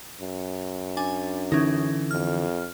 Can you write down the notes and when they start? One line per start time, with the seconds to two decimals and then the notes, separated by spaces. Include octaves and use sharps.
0.21 F#2
0.97 D4 G#5
1.52 D3 E3 C#4 D#4
2.11 F2 F6